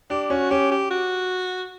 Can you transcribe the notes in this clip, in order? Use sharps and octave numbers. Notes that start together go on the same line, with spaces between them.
D4 G4
C#4 F#4
C#4 G4
G4
F#4